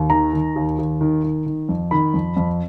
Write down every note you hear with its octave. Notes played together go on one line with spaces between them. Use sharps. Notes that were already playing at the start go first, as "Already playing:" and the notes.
Already playing: D#2
D#3 A#5
D#3
D#2
D#2
D#3
D#3
D#3
F2
D#3 B5
F2
F2